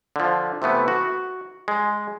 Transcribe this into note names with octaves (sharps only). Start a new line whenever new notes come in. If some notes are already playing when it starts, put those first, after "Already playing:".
D3 F3
C3 E3 A3 B3
F#4
G#3